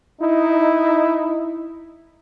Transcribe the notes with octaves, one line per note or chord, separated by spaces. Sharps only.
D#4 E4